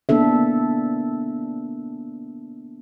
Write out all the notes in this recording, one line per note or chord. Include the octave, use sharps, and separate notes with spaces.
A#3 B3 D4 A4 E5